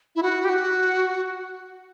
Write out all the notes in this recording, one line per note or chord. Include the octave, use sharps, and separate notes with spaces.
E4
F#4
G4
F#4